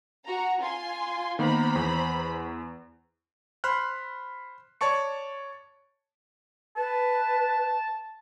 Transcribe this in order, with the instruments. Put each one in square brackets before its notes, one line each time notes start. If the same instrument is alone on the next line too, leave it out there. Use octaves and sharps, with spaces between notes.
[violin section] F#4 A#5
F4 G#5 C6
[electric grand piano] D#3 A#3 B3 [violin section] C5 A#5 B5
[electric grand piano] E2
C5 B5 C6 F6 F#6
C#5 D5 A5 C#6 C#7
[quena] B4 [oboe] A5